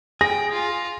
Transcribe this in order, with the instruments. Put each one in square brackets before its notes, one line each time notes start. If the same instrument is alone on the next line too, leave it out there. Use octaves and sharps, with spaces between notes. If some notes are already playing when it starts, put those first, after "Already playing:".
[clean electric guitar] G#4 [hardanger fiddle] G5 [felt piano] A#6
[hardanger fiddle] F4